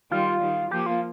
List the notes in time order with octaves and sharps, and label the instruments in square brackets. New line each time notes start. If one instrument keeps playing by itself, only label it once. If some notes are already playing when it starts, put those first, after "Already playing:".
[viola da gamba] D#3 G3 [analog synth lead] F4
[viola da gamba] D#3 G3
[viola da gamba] F3 A#3 [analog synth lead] G4
[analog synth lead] F4